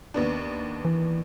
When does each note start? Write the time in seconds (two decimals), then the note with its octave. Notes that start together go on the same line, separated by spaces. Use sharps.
0.14 D#2 B3 D4
0.85 E3